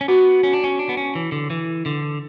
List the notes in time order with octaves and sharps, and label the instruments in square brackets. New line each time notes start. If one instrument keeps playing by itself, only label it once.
[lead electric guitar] C#4
[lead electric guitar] B3 [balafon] F#4
[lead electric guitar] C#4
D4
C#4
D4
B3
C#4
E3
D3
E3
D3